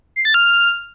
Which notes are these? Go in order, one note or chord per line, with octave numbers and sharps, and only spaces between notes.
C7
A6
F6